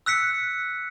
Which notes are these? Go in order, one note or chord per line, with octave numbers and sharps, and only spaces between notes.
E6 F#6 B6 C#7